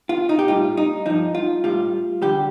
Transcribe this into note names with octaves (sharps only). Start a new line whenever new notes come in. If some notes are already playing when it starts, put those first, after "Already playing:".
F4
D#4
G4
A2 G3 F4
D#4
G2 F3 D#4
F4
A2 G3 F4
D3 G3 G4